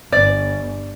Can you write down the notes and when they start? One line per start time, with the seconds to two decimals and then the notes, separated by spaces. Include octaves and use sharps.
0.12 G1 D5